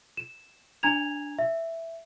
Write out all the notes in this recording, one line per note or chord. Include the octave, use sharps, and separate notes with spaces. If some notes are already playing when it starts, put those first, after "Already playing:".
E7
D4 G#5 A#5 G#6 F7
E5